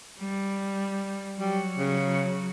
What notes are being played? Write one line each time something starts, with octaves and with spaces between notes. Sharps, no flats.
G3
F#3 G3
C#3